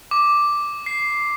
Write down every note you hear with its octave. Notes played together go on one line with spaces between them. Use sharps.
D6
C7